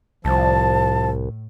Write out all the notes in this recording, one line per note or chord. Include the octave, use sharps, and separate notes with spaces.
C2 A2 F3 A5